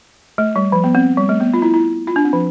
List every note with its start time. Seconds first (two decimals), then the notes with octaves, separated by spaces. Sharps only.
0.38 A3
0.56 G3
0.72 F3
0.84 B3
0.95 C4
1.18 G3
1.29 A3
1.40 B3
1.54 F4
1.62 E4
1.74 E4
2.07 F4
2.16 D4
2.25 C4
2.33 F3